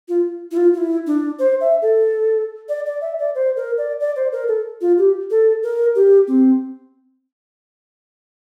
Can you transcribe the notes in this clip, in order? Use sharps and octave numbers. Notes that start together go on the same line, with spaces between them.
F4
E4
F4
F4
E4
D4
C5
E5
A4
D5
D5
E5
D5
C5
A#4
D5
D5
C5
A#4
A4
F4
G4
A4
A#4
G4
C4